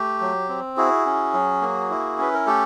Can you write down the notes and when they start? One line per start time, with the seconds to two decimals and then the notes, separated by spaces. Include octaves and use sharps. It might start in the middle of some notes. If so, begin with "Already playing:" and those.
Already playing: A3 G4
0.21 F#3
0.49 C4
0.77 E4 F#4 G#4
1.06 C#4
1.34 F#3
1.62 A#3
1.90 E4
2.18 C#4 B4
2.34 A#4
2.46 A3 G4 A4